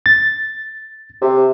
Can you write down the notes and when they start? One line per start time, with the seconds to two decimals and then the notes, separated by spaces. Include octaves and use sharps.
0.06 A6
1.22 C3